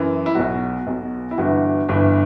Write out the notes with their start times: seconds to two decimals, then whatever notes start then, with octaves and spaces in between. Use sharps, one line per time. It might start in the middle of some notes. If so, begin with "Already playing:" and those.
Already playing: F#2 E3
0.26 E4
0.35 B1 B2 F#3 F#4
0.87 B1 B2 F#3
1.31 E4
1.38 G1 G2 E3 F#4
1.89 G1 G2 E3